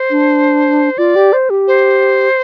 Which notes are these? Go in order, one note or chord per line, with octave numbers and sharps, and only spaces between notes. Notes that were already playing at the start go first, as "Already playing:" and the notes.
Already playing: C5
D4
F4 D5
G4
C5
G4
C5